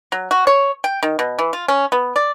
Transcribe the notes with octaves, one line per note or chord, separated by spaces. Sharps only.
F#3
F#4
C#5
G5
D#3
B2
E3
F4
C#4
B3
D5